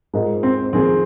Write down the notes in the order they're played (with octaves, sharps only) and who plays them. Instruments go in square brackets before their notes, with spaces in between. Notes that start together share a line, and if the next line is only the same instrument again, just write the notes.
[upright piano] G#2 G#3 F4 A#4 D#5
[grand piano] C4
[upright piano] F2 D#3 A#3 G#4 [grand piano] C4